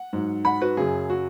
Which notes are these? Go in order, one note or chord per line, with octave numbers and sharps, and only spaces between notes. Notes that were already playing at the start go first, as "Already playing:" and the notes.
Already playing: F#5
G#2 F#3
F#5 B5
F#4 B4
F#2 C#3 F#3 G#4
F#4